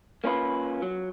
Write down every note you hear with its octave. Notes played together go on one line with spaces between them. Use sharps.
A#3 C#4 F4 B4
F#3